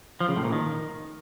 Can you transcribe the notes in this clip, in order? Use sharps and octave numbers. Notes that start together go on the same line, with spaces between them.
F3
C#3
A2
A#2
D#3